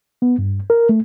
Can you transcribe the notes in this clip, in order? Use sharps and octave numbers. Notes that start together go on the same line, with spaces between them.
B3
G2
A#4
A3